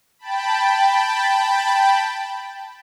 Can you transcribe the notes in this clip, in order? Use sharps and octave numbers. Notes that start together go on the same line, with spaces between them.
G5 A5 B5